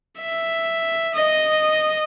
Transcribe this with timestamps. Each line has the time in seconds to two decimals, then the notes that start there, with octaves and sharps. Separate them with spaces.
0.19 E5
1.14 D#5